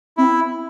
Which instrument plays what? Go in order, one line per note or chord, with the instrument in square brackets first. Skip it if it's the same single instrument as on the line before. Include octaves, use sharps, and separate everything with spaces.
[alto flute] C4 [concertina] E4